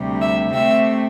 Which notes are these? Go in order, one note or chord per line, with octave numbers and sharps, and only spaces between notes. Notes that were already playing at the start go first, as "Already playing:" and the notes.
Already playing: D2 C3 G3
E5
C3 A3 C4 E5